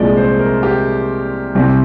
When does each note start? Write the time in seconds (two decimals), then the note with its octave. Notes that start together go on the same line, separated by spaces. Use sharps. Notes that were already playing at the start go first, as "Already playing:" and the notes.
Already playing: C2 A#2 F3 G#3 D5
0.17 C5
0.39 A#4
0.63 G4
1.55 C2 C3 G3 G4